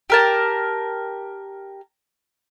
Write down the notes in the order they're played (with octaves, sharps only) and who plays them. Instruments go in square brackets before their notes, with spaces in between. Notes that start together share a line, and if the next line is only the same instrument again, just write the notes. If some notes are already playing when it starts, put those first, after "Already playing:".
[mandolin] G4 A#4 A5